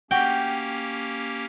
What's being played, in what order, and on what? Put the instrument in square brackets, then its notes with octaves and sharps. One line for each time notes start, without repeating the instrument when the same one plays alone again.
[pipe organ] A#3 C#4 G4 [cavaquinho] F#4 [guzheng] G5